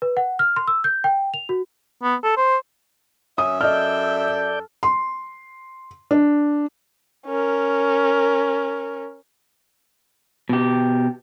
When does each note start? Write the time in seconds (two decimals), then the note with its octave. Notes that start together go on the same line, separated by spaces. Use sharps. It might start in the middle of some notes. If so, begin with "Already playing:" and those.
0.02 B4
0.17 F#5
0.39 F6
0.56 C6
0.67 E6
0.84 G6
1.04 G5
1.34 F7
1.49 F#4
2.03 B3
2.23 A4
2.37 C5
3.38 F#2 C#4 E5 D#6
3.61 A4 D5 D#5 F6 G6
4.83 C6
6.11 D4
7.27 C#4 A#4
10.49 B2 G4